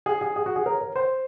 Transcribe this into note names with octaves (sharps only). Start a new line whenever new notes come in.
G#4
G#4
G#4
F#4
G#4
A#4
A#4
C5